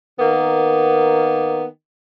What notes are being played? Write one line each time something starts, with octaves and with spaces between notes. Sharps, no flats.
D#3 A#3 B3